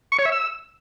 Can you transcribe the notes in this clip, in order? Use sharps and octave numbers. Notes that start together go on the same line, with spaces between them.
C#6
C#5
E5
E6